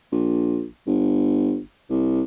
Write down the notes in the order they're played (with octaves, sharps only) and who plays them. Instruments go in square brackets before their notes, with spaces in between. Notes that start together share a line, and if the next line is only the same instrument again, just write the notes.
[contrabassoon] A#1
G1
C2